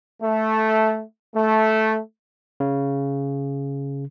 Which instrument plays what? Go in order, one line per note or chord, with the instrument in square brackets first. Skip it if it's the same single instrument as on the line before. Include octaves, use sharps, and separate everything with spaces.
[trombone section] A3
A3
[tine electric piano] C#3